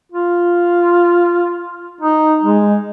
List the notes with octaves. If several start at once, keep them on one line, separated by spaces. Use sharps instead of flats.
F4
D#4
G#3